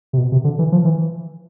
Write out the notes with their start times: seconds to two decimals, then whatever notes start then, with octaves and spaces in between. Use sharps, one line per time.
0.13 C3
0.18 B2
0.32 C3
0.44 D3
0.59 E3
0.72 F3
0.85 E3